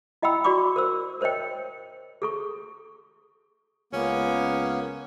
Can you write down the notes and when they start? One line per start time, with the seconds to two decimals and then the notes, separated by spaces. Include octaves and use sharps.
0.22 E4 D#5 F#5 G5 B5 E6
0.44 F#4 D5 B5 C#6 D6
0.76 A#4 C5 E6
1.21 A#4 C5 C#5 D#5 G5
2.22 G#4 A4 C#6
3.93 C#2 A#3 B3 C#4